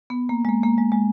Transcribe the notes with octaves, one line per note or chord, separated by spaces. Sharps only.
B3
A#3
G#3
A#3
A#3
G#3
G#3